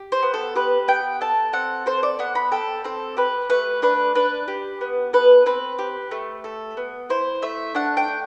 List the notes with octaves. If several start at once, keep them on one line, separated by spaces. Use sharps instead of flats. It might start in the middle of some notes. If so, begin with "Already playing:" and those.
Already playing: G4
C5
B3
A4
G4 B4
B3 G5
A4 A5
C4 F#5
A4 C5
D5
B3 F#5
B5
A4 G5
C4 A4
G4 B4
A3 B4
D4 B4
D4 B4
G4
B3
A4 B4
C4 B4
G4
A3
A4
B3
E4 C5
A3 E5
D4 F#5
G5
D4